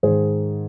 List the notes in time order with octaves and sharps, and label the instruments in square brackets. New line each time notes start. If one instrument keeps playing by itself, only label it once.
[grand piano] G#2 D#3 G#4 C5